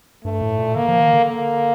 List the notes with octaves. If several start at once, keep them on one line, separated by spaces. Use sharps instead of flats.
G2 A3
A2
A#2
D3 A#3
F3
D#3
D3
A#3